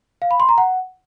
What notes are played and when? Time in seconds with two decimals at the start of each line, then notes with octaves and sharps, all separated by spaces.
0.22 F5
0.31 B5
0.40 C6
0.49 A#5
0.58 F#5